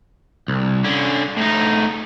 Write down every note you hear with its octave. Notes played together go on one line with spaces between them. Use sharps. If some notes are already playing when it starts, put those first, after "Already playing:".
C2
D3 C#4
A2 D#4